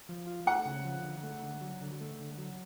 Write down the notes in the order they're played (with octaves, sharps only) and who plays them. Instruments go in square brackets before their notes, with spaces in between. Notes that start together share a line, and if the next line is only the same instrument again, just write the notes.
[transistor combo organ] F3
F4
[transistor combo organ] A3 [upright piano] F#5
[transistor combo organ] C#3
F3
D3
A3
D3
F#3
D3
A3
D3
F#3